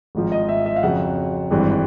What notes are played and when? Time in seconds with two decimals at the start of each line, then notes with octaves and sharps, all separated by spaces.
0.15 G#1 G#2 F3
0.32 D#5
0.49 E5
0.66 E5
0.76 F5
0.83 F2 C#3 F#3 F#5
1.51 G#1 G2 E3 G#3 C4